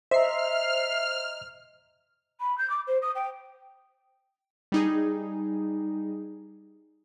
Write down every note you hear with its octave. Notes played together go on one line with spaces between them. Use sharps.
C5 D#5 E5 A#5 F6 C7
B5
G6
D6
C5
D#6
G5
G3 D#4 G#4